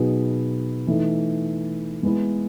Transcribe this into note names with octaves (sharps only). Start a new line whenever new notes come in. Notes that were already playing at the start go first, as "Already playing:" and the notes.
Already playing: B2 F#3 B3 D#4 G#4
E3 A3 D#4
G#3 B3 E4 B4